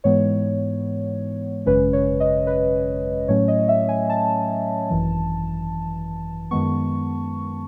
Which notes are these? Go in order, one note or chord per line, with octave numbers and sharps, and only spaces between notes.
G#2 E3 G#3 B3 C#5
G#1 F#2 C#3 G#3 C#4 B4
C#5
D#5
B4
A2 F#3 A3 C#4 C#5
D#5
E5
G#5
A5
G#1 F#2 E3
F#2 D#3 G#3 B3 C#6